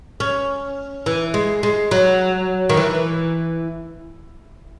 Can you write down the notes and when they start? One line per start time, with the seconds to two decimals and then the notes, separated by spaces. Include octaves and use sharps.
0.20 C#4
1.06 E3
1.34 G#3
1.63 G#3
1.91 F#3
2.69 D#3
2.77 E3